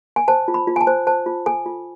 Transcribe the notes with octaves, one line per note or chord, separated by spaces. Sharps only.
G#5
C5 A5
F4
B5
F4
G#5
A5
C5
C5 A5
F4
A4 G#5
F4